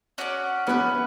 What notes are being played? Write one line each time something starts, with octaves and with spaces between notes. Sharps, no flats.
C#4 F#4 A4 D5
B3 C#4 E4 B4